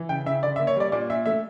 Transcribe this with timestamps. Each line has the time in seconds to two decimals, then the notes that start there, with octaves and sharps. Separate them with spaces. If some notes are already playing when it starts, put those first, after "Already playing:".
Already playing: E3
0.09 C#3 G5
0.26 C#3 E5
0.42 D3 D5
0.56 E5
0.59 A#3
0.67 C#5
0.76 G3 D5
0.92 A#2 D5
1.10 A#2 E5
1.26 A3 E5